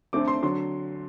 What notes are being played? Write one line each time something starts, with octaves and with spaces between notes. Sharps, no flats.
D2 D3 A3 C4 D6
C6
D3 F#3 C6